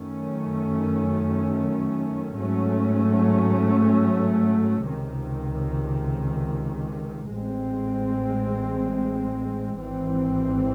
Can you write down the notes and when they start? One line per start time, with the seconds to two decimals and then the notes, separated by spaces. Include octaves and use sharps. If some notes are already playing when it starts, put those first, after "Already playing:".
Already playing: F#2 D#3 A3 C#4
2.37 G#2 F#3 A3 C#4
4.85 C#2 C3 D#3
7.32 A1 A2 G#3 C4
9.80 G#1 G#2 E3 C4